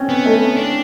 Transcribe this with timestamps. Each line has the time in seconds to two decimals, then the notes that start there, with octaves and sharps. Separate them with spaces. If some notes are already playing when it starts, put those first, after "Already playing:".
Already playing: C4 C#4
0.09 B3
0.25 A3
0.57 D4